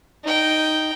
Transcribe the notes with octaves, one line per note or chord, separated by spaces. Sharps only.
D#4 G5